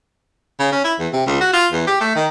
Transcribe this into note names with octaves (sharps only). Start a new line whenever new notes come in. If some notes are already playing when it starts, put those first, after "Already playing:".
C#3
C#4
E4
E2
C3
C#2
F#4
F4
E2
G4
A3
D#3